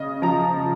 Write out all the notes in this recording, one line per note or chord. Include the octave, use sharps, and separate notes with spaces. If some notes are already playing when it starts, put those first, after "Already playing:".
Already playing: C#3 D#5
F3 A#5